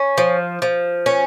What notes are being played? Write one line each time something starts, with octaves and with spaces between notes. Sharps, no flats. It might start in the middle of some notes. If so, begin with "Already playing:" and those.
Already playing: C#4
F3
F3
C#4